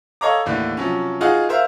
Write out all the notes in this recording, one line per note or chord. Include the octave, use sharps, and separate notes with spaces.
A4 C#5 D#5 F5 A#5 D6
D#2 A2 D3 E3
C3 F3 F#3 C#4
D#4 F4 F#4 G#4 D#5 F#5
A#4 C5 E5 F5